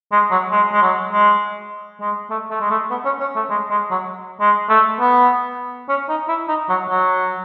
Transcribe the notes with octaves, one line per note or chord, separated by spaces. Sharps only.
G#3
F#3
G#3
G#3
F#3
G#3
G#3
A3
A3
G#3
A3
B3
C#4
C#4
A3
G#3
G#3
F#3
G#3
A3
B3
C#4
D#4
E4
D#4
F#3
F#3